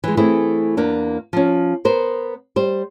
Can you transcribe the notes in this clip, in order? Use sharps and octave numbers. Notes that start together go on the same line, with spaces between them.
E3 G#3
E3 A3 C4 E4 G#4
E2 A#3 D4
F3 C#4
B3 A#4 C5
G3 C5